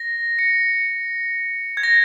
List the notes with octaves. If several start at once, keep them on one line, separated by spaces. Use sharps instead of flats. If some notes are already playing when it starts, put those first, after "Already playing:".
Already playing: A#6
C#7
G#6
A#6